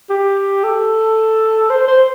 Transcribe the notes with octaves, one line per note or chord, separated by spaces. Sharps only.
G4
A4
C5
C5